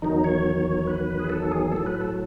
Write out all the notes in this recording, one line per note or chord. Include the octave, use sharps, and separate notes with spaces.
E2 D#3 F#3 D#4
C#5
B4
G#4
A4
G#4
A2 F#3 A4
B4
A4